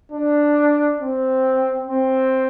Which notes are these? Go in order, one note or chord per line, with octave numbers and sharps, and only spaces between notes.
D4
C4
C4